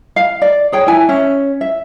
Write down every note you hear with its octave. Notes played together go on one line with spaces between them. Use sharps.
F5
D5
G#4 C#5 G5
E4 G#5
C#4 E5
E5